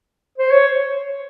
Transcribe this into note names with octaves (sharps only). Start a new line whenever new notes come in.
C5
C#5